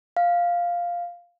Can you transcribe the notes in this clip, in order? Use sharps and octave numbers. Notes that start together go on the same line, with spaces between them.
F5